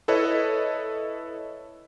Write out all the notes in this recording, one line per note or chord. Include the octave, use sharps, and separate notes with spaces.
E4 A4 B4 C#5 D#5